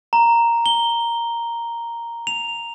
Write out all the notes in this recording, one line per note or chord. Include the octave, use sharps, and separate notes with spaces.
A#5
G7
F7